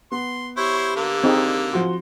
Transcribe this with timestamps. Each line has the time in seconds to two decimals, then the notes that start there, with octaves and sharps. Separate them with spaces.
0.12 B3 C6
0.57 E4 G4 C5 C#5
0.96 D3 A#3
1.24 C4 D#4 G#4
1.73 F3 F#4 C6